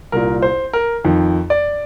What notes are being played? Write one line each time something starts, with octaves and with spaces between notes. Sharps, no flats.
C2 A#2 A#4
C5
A#4
F2 D#3
D5